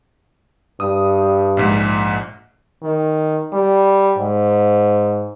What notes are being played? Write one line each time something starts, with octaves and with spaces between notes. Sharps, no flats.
G2 D#6
A#1 G#2
D#3
G3
G#2